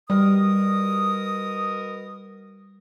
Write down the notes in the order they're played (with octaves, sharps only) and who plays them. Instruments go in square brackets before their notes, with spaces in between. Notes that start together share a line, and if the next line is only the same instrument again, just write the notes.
[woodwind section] B2 A#4 D#6 [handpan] G3